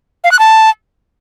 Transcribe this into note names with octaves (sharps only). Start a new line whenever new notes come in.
F5
F#6
A5